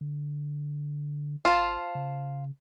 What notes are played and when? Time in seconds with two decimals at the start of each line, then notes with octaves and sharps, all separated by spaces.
0.01 D3
1.45 G#1 F4 C5 F5 A5
1.95 C#3